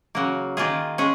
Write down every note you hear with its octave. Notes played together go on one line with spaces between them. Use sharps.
C#3 F#3 A#3
D#3 A#3 F4 G#4
G#3 C#4 G#4